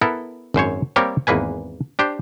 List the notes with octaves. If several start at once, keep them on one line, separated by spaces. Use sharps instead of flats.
B3 E4 A4 A#4
G#1 F#2 C5 C#5
G3 A#3 C4 G4 A#4 C#5
G#1 E2 A#3 B4 G#5
D4 G4 C5